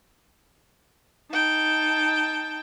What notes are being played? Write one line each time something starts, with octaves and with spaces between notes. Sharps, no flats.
D#4 G5 A5